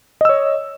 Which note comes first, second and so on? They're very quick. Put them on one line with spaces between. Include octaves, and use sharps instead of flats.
D#5 E6 C#5